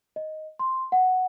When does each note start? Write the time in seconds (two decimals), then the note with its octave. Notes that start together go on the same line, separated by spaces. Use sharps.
0.16 D#5
0.59 C6
0.92 F#5